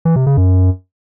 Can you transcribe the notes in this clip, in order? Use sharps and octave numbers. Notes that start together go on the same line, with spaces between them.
E3
C3
C#3
F#2